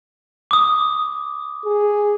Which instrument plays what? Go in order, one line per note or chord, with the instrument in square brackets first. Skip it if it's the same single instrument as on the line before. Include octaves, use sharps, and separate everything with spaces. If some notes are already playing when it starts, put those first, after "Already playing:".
[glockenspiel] D6 D#6
[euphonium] G#4